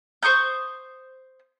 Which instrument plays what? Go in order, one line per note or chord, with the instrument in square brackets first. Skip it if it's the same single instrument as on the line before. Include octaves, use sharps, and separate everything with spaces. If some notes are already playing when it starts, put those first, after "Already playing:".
[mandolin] C5 C#6 D#6 G6